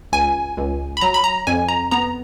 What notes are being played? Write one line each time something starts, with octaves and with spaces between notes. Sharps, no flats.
C#2 G#5
C#2
B5
F#3 A#5
B5
A#5
F2 G#5
A#5
B3 A#5